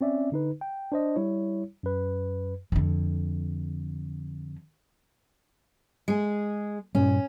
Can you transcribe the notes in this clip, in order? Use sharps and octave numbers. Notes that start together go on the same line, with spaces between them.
C4 C#4 D5 E5
D3 D#4 B4
G5
D4 C5 D#5
G3 E4 C#5
F#2 B4
F2 D3
G#3 G#4
G2 A#2 G3 C#4